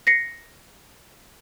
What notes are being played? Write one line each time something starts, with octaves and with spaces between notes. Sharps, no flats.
A#6 C7 C#7